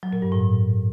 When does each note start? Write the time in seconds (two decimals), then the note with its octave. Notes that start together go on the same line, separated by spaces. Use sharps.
0.03 F#3
0.13 A#2
0.22 G2
0.32 A2